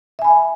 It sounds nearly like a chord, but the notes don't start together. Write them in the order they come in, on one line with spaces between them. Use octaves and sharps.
E5 G#5 B5